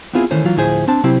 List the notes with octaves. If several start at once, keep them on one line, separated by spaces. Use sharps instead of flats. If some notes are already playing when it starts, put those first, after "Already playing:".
B3 C4 E4 F4 G#4
D#3 E3 A3 C#4 C5
E3 F#3 F4
D2 A2 F3 E4 G#4 C5
C4 D4 A5
C3 F#3 C4 E4 G4